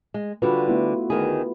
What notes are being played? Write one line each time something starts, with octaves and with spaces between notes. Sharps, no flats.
G#3
D3 G3 F4 F#4 B4
A3 B3 E4
D2 D#3 G#4